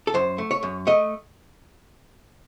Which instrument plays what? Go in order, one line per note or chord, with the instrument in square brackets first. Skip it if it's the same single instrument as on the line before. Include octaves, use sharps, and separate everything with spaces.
[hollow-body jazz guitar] A4
F#2 C5
A3
C#5
F#2
A3 D#5